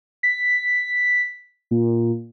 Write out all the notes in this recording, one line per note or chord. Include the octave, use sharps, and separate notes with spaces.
B6
A#2